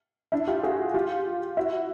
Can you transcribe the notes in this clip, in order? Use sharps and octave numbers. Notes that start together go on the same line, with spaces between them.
D4 E4
F4 G4
F#4 G#4
F4 G4
E4 F#4